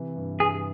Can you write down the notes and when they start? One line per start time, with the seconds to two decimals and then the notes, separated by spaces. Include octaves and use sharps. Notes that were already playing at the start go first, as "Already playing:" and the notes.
Already playing: C3 E3
0.16 G2
0.40 G2 G#4